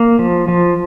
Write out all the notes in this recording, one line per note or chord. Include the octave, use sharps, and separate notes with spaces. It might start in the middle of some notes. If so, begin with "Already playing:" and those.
Already playing: A#3
F3
F3